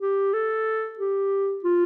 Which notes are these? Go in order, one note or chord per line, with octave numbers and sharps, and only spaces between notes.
G4
A4
G4
F4